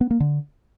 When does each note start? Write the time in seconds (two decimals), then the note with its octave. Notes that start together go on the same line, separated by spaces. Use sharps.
0.01 B3
0.11 A#3
0.20 D3